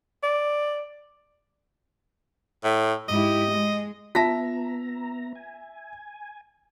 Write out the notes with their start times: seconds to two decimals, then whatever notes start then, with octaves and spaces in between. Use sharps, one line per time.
0.23 D5
2.64 A2
3.09 G#2 E4 G4 D#5
3.47 G#3
4.15 B3 F4 E5 A5 A#5 A#6 B6
5.35 G#5